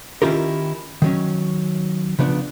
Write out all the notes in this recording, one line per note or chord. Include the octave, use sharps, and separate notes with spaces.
D#3 C#4 E4 F4 G4 A#4
D#3 F#3 C#4
C#3 F3 B3 D4